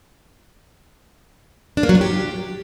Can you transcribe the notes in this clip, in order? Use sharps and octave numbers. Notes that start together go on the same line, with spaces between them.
D4
A#3
F#3
F4
G4